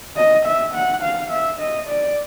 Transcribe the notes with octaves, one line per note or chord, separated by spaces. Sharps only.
D#5
E5
F#5
F5
E5
D#5
D5